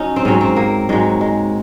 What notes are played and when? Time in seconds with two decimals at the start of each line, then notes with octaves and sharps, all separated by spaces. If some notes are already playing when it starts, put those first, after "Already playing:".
Already playing: F#3 C#4 D#4
0.16 C4
0.25 G#2 F#3 C#4
0.41 C4
0.56 A#3
0.89 G#2 F#3 G#3
1.21 G#3